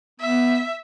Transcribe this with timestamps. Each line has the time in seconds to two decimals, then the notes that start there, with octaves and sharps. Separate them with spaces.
0.20 B3 E5